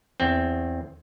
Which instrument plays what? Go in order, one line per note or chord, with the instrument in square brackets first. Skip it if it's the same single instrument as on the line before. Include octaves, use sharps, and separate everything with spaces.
[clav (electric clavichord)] E2 C4